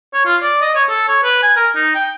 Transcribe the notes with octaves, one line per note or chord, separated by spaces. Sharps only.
C#5
F4
D5
D#5
C#5
A4
C#5
B4
G#5
A#4
D#4
G5